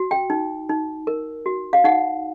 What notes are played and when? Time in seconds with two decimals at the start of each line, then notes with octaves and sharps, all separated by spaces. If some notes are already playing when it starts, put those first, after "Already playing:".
Already playing: F#4
0.11 G5
0.30 D#4
0.69 D#4
1.07 A#4
1.46 F#4
1.73 F5
1.84 D#4 F#5